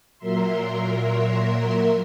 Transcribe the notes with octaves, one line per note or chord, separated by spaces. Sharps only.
A#2 F#3 A#4 E5 C6